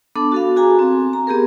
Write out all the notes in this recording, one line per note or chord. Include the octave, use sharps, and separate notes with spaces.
B3 D4 A4 A5 D6
F#4 A4 F5
F#4 G#4 F5 G#5 A#5
C4
A#5
B3 G4 G#4 A#4